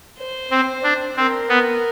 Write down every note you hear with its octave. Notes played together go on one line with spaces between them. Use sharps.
C5
C4
D4
C4 A#4
B3